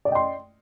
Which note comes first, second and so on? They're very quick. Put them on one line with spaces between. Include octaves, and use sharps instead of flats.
D5 D#5 G5 C6